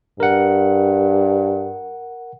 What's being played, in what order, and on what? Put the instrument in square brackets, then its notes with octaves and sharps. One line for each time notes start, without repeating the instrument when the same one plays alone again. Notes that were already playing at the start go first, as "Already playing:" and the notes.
[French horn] G2 [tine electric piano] A#4 F#5